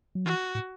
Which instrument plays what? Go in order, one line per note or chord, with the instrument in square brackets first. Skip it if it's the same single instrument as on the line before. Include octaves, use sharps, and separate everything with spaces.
[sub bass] F#3
[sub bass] E3 [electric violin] F#4
[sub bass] A2